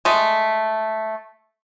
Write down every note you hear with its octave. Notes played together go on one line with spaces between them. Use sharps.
G#3 A3